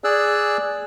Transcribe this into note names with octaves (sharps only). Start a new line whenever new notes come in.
G#4 D5 E6 F#6